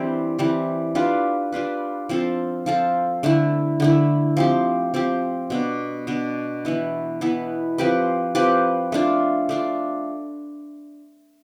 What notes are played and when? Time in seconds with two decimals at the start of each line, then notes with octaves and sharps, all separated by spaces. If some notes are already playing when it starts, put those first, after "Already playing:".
Already playing: E3 G3 C4 D4
0.39 E3 G3 C4
0.95 G3 D4 F4 B4
1.52 G3 D4 F4 B4
2.09 F3 C4 F4 A4
2.66 F3 C4 F4 A4
3.23 D3 A3 E4
3.80 D3 A3 E4
4.37 F3 C4 G4
4.94 F3 C4 G4
5.50 B2 B3 D4
6.07 B2 B3 D4
6.65 E3 B3 E4
7.21 E3 B3 E4
7.78 F3 C4 G4 B4
8.35 F3 C4 G4 B4
8.92 A3 D4 F4
9.49 A3 D4 F4